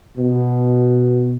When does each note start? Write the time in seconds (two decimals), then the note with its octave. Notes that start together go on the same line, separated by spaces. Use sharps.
0.17 B2